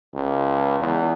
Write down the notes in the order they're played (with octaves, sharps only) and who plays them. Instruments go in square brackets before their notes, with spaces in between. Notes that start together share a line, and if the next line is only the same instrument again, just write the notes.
[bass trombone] C#2
E2